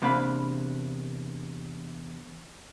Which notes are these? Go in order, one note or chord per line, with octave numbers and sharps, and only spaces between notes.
E2 C3 A#3 D4 F5 B5